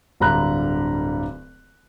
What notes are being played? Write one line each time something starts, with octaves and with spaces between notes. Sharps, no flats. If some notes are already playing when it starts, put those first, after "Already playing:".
D1 G2 D3 A#5 B5 F#6